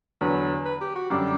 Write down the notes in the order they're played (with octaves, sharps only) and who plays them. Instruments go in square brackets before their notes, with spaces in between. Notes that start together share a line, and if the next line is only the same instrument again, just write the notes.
[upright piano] E2 D3 F#3 [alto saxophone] B4
[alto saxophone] B4
G4
F#4
[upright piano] F#2 D3 G3 D4 [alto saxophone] G4